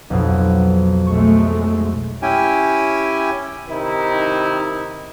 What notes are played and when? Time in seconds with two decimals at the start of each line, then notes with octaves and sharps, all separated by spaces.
0.10 B1 F2 B2
1.07 B1 G#3 A3 C#6
2.22 C#4 E4 G4 G5 G#5
3.67 C3 D#3 D#4 E4